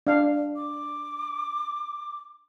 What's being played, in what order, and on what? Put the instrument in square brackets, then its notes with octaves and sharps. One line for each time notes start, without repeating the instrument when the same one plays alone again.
[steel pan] D4 F5
[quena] D6